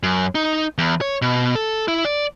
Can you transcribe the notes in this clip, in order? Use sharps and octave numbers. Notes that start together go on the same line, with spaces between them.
F#2
D#4
E2
C#5
B2
A4
E4
D5